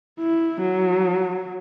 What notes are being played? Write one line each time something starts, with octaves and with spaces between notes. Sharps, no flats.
E4
F#3